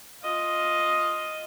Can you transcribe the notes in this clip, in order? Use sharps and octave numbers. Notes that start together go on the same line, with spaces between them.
F4 D#5